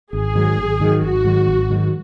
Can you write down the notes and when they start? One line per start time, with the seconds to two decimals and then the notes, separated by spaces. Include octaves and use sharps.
0.13 G#1 G#4
0.35 G#2 D#3 F#3
0.57 G#1
0.80 G#2 D#3 F#3
1.02 G#1 F#4
1.25 G#2 D#3 F#3
1.48 G#1
1.70 G#2 D#3 F#3